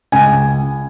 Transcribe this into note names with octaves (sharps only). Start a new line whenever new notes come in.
C#2 G#5